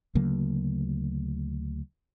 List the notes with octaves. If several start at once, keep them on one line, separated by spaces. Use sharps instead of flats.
D2 C#3 F#3 A#3